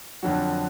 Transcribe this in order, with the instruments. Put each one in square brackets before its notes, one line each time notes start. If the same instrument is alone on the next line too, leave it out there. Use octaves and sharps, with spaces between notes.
[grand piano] F2 D3 F#3 F#4